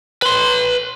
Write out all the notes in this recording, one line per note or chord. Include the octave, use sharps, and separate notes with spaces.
B4 C6